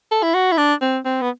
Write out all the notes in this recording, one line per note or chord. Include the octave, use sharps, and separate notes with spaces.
A4
E4
F#4
E4
D4
C4
C4
B3